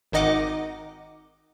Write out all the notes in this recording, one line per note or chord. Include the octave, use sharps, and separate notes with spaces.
G#1 D#3 D#4 D#5 F#5 D6